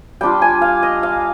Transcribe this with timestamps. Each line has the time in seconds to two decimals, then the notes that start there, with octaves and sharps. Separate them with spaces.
0.21 G3 D4 F4 G5
0.42 G#5
0.61 F5
0.83 D#5
1.03 F5